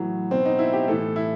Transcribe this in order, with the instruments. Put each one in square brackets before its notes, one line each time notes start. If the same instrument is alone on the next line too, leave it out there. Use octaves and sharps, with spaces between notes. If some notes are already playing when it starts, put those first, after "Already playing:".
Already playing: [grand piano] A2 E3 F#3
B2 C4
D#4
E4
G4
A2 E3 A4
E4